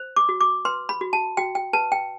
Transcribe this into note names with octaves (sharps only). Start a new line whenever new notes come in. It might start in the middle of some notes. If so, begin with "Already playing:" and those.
Already playing: C5
D6
F#4
D6
B4 C6
B5
F#4
A5
F#4 G5
G5
B4 A5
G5